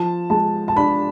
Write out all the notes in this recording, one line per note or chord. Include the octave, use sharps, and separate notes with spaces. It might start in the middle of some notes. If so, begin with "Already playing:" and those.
Already playing: F3 A5
G#3 A5
A5
D4 B5